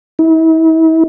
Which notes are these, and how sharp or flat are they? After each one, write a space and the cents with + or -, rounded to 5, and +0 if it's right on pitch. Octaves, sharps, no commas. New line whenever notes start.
E4 -40